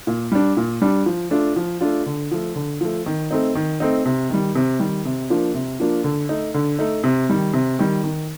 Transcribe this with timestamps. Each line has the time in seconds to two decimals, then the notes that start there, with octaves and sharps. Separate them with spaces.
0.07 A#2
0.32 G3 D4
0.57 A#2
0.82 G3 D4
1.06 F3
1.31 A3 D4 F4
1.56 F3
1.81 A3 D4 F4
2.06 D3
2.31 F3 A3
2.56 D3
2.81 F3 A3
3.06 D#3
3.31 A3 C4 D#4
3.55 D#3
3.80 A3 C4 D#4
4.06 C3
4.30 D#3 G3
4.55 C3
4.79 D#3 G3
5.05 C3
5.30 F3 A#3 D4 F4
5.54 C3
5.80 F3 A#3 D4 F4
6.04 D3
6.29 A3 D#4
6.54 D3
6.79 A3 D#4
7.04 C3
7.30 D#3 G3
7.53 C3
7.79 D#3 G3
8.04 D#3